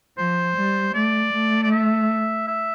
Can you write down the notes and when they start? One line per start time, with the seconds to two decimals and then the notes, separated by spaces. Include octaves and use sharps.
0.18 F3 C5
0.56 G3
0.94 A3 D5
1.33 A3
1.63 D5
1.71 E5
2.48 E5